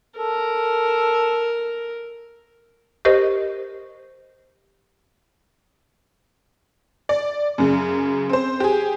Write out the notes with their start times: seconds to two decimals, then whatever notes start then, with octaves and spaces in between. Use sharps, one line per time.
0.18 A4 A#4
3.05 G4 A#4 C5 D#5 C#6
7.09 D5
7.58 F#2 C#3
8.29 C4 C5
8.60 G4 G#4